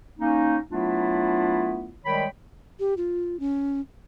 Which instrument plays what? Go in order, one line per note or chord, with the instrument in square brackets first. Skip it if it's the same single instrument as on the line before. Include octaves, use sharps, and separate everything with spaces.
[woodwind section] A#3 C#4 D#4
F#3 A3 B3 D4 E4 F4
D#3 G3 G#3 C#5 G5 B5
[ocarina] G4
F4
C#4